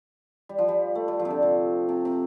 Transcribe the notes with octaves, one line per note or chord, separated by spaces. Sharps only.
G3
F3
G3
A3
G3
F3
C3
D3
C3
C3
C3